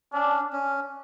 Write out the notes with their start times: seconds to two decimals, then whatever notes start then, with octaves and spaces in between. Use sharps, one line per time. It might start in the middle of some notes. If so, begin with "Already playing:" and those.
0.13 C#4 D4
0.52 C#4